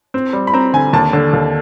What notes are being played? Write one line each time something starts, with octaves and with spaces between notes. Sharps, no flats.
C4
G3
B5
C4 A#5
D3 G#5
D#2 A5
D3
D#2